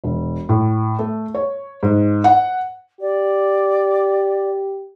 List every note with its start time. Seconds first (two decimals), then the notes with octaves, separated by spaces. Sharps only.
0.04 E1
0.49 A2
0.99 A3
1.34 C#5
1.83 G#2
2.24 F#5
3.00 G4 D5